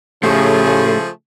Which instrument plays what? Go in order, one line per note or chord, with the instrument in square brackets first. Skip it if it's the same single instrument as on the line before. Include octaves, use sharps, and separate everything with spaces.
[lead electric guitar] A2 [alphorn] C#3 [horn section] F3 A3 G#4 [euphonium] G4